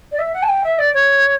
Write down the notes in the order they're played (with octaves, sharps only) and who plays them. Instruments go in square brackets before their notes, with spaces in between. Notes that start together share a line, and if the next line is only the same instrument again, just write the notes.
[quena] D5
E5
F#5
A5
G5
E5
D5
C#5